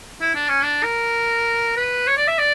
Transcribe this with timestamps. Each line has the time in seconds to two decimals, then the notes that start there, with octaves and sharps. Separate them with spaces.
0.21 E4
0.35 D4
0.48 C#4
0.62 D4
0.83 A#4
1.76 B4
2.07 C#5
2.17 D5
2.27 E5
2.38 D5